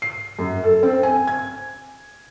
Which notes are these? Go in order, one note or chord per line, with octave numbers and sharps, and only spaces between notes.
C7
F#2
A4
C4
G#5
G#6